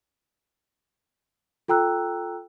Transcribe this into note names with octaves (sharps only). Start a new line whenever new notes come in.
F4 A4 G5 A#5 E6 F#6